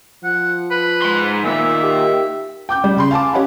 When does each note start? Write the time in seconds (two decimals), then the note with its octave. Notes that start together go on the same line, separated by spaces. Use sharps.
0.24 F3 F#5
0.71 B4
1.02 G#2 C6
1.45 A#2 D#3 E5
1.83 G4
2.69 G5 D6 G6
2.84 G3
2.96 C#3 B5 C6
3.11 F5 G#5 A5 D6
3.33 C#4 G4 C#5 D#5 F#5 B5